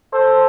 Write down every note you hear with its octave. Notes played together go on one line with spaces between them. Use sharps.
A4 C5